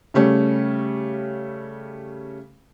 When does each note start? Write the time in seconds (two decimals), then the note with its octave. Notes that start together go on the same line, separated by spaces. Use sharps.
0.14 C#3 G3 A3 C#4